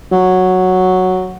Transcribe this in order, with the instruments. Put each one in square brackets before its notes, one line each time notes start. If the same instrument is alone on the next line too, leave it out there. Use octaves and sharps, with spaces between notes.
[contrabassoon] F#3